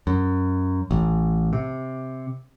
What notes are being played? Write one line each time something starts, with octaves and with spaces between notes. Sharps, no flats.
F#2
A1
C3